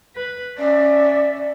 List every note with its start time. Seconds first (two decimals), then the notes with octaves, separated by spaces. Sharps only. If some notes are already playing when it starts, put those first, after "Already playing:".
0.16 B4
0.58 C#4 D5 E5